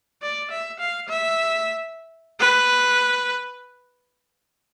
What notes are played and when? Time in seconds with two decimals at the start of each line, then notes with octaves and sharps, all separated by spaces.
0.22 D5
0.51 E5
0.80 F5
1.09 E5
2.40 B4